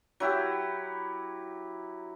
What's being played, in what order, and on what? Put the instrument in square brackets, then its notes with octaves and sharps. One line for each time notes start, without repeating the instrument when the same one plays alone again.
[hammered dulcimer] F#3 E4 G4